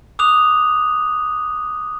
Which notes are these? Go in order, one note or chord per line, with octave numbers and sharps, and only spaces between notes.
D6 D#6 F#6 F7